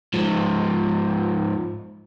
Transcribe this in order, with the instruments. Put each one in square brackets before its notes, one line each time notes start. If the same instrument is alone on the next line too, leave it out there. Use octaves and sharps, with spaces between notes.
[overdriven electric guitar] G#2 F3